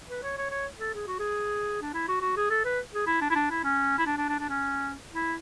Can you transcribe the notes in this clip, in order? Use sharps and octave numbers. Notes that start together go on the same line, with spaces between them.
B4
C#5
C#5
C#5
A4
G#4
F#4
G#4
D4
E4
F#4
F#4
G#4
A4
B4
G#4
E4
D4
E4
D4
E4
C#4
E4
D4
D4
D4
D4
C#4
E4